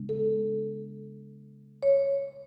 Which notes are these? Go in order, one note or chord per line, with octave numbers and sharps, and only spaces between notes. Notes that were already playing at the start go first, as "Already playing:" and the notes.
Already playing: C#3 G#3 B3 D4
A4
C#5